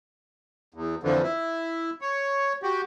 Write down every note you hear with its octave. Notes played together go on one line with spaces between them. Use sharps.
E2
F2 D3 E3 F3
E4
C#5
F#4 G4